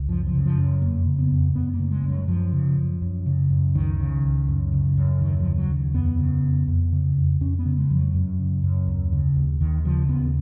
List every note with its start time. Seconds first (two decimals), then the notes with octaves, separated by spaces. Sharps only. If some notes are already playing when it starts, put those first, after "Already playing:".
Already playing: C#2
0.09 F#2 F3
0.27 F3
0.33 C#3
0.45 F3
0.58 F#2
0.82 F2 A#3
1.06 C#3
1.19 B3
1.31 F2
1.55 F#2 B3
1.74 A#3
1.79 C#3
1.91 G#3
2.03 F#2
2.10 F#3
2.28 F#2 F3
2.53 C#3
2.77 F#2
3.02 F#2
3.26 C#3
3.50 F#2
3.75 C#2 D#3
4.00 C#3
4.23 C#2
4.48 F#2
4.73 C#3
4.97 F#2
5.21 D#2 D#3
5.40 F3
5.45 C#3
5.58 F#3
5.70 D#2
5.94 F2 B3
6.19 C#3
6.43 F2
6.68 F2
6.92 C#3
7.16 F2
7.41 F2 C#4
7.59 B3
7.66 C#3
7.78 G#3
7.90 F2 F3
7.96 F#3
8.14 F#2
8.39 C#3
8.63 F#2
8.88 D#2
9.12 C#3
9.36 D#2
9.61 D#2 D#3
9.85 C#3 F3
10.09 D#2 B3